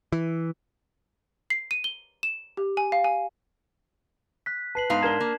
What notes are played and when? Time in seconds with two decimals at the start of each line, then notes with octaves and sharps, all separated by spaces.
0.12 E3
1.50 C7
1.71 D#7
1.84 G7
2.23 E7
2.57 G4
2.77 G#5
2.92 F5
3.04 G#5
4.46 F#6 B6
4.75 B4 A5 C7 F#7
4.90 G#2 B3 D#4 F5
5.02 D4 A#4 A5 G#6 E7 G7
5.20 A#3